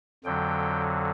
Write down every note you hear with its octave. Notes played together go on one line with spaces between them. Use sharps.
F2 D3 F#3 G5